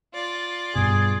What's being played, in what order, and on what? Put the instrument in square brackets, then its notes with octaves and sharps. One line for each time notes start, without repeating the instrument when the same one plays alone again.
[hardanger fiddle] F4 D5
[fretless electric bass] G2 B2 [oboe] G#4